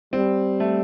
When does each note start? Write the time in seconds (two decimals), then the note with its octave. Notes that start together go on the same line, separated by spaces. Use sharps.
0.13 G3 C4
0.60 A3